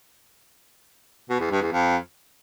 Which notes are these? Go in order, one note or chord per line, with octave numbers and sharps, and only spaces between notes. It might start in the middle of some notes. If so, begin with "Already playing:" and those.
B2
E2
G2
E2
F2